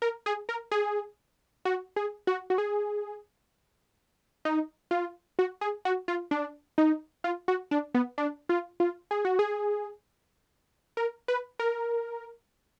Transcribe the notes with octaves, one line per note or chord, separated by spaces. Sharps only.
A#4
G#4
A#4
G#4
F#4
G#4
F#4
F#4
G#4
D#4
F4
F#4
G#4
F#4
F4
D4
D#4
F4
F#4
D4
B3
D4
F4
F4
G#4
F#4
G#4
A#4
B4
A#4